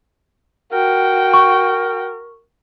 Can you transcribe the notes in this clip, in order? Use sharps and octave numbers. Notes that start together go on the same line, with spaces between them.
F#4 A#4 G5
C#6